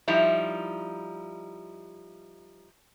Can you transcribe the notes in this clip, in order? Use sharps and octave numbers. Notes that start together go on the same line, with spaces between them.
F3 G3 D#4 E4